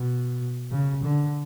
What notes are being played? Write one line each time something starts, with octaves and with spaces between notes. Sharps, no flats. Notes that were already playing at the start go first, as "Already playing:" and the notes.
Already playing: B2
C#3
D3